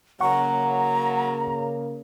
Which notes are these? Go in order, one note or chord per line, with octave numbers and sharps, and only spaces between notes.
C#3 F#3 A#3 F#5 A#5 C#6